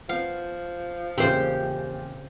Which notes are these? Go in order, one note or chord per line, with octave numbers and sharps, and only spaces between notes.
F3 B3 B4 F5 F#5
E2 A#2 C#3 C4 G4 C5